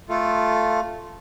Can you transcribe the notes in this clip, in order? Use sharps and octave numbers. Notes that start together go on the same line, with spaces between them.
A3 F4 A4